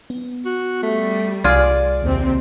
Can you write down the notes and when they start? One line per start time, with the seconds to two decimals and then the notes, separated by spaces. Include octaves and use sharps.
0.10 B3
0.45 F#4
0.83 G3 A3
1.44 C2 F4 G#4 D5
2.02 D#2 C3 C4